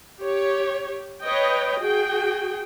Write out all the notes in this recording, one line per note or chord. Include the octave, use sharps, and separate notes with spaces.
G4 C#5
B4 C#5 D#5 G5
F#4 G#4 G5